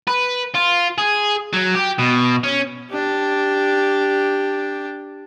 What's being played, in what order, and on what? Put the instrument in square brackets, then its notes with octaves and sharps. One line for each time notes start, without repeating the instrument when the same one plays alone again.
[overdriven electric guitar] B4
F4
G#4
F#3
G4
B2
C#4
[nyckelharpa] D4 G4